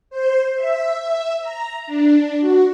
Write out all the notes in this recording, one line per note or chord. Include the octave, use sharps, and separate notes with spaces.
C5
E5
E5
A#5
D4
F#4